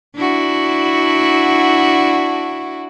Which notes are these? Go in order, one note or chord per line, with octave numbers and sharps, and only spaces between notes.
D4 E4 F#4